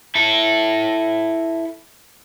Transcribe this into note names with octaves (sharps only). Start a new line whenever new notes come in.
E4 A4